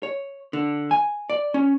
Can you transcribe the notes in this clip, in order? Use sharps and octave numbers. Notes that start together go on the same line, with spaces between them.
C#5
D3
G#5
D5
C#4